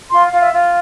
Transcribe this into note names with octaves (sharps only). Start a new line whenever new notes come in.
F4 C6
F5
F4
E5
F4